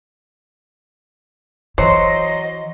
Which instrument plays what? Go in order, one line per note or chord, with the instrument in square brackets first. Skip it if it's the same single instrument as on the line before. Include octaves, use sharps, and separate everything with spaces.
[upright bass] E3 [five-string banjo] F#3 [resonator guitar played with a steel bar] C5 [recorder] D#5